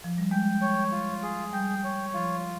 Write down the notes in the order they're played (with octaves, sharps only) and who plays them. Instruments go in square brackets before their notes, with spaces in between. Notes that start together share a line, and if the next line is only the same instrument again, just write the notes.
[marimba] F3
G3
[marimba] G#3 [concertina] G5
[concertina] C#5
F4
G#4
[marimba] G3 [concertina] G5
[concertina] C#5
[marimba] F3 [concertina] F4